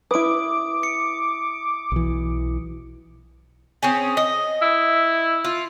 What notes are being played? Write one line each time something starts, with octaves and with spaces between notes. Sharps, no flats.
E4 B4 D6 D#6 D7
C#7
B1 E3
C4 C#4 G#4
D#5
E4
F4